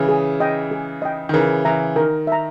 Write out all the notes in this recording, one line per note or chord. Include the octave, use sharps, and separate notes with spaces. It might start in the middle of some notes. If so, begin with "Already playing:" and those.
Already playing: C#3 E3
G#4
D#5 G5
G#4
D#5 G5
D#3
C#3 E3 A#4
C#3 E3 E5 A#5
D#3 A#4
E5 A#5